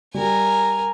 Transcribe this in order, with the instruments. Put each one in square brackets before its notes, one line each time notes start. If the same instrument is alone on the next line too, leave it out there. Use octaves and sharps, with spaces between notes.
[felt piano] G3 [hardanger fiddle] A#4 G#5